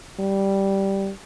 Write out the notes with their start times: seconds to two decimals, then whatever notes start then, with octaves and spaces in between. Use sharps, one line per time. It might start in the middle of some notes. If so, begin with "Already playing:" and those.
0.19 G3